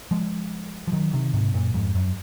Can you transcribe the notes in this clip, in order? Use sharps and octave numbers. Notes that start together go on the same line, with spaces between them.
F3 G#3
F3
D#3 F#3
C3 D#3
G#2 C3
F#2 A#2
F2 G#2
F#2